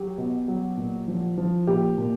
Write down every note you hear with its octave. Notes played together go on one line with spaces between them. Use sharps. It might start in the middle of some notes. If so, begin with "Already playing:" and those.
Already playing: F#3 G4
B2
F#3
A#2
F3
F3
A#2 G4
A#2